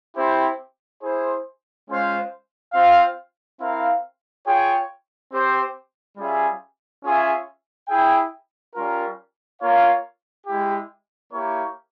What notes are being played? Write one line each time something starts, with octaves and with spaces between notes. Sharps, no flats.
C4 E4 G4 C5 G5
E4 G#4 C5
G#3 C#4 F4 C5 F5
C4 F4 C5 F5
C4 E4 A#4 F5
F4 G#4 C#5 G5
C4 G4 C5
G3 C#4 F4 G#4 E5
C#4 F4 G#4 E5
E4 G#4 E5 G5
G3 C#4 F4 A#4
A#3 F4 A#4 C#5 F5
G#3 E4 G4
A#3 E4 G4 A#4 C#5